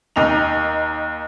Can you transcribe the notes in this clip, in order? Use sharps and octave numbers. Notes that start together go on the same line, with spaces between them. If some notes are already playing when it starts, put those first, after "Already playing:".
D#2 D#4 F7